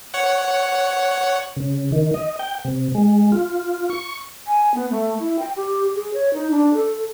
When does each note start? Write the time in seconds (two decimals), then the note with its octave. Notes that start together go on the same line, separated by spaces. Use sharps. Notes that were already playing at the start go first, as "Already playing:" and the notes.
0.14 C#5 F#5
1.57 C#3
1.92 D#3
2.14 D#5
2.39 G5
2.65 C3
2.95 G#3
3.32 F4
3.90 C#6
4.47 G#5
4.74 B3
4.90 A3
5.19 E4
5.39 G5
5.56 G4
5.95 G#4
6.14 C#5
6.34 D#4
6.51 D4
6.74 A4